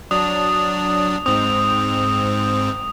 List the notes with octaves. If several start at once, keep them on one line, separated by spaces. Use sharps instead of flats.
F#3 D4 D#6
G#2 C4 D#6